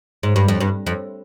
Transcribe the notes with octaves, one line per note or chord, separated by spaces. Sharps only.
G#2
G2
F2
G2
F2